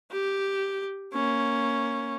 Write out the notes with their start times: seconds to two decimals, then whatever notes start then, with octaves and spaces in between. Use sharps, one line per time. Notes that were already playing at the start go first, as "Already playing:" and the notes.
0.12 G4
1.13 A#3 C#4